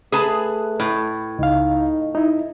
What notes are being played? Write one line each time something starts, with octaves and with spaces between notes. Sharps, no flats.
A3 G#4 B4 A5
A2
C#2 D#4 F5
D#4 E4